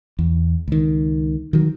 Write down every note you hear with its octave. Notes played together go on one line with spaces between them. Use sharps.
E2
C#2 D#3
D#3 F#3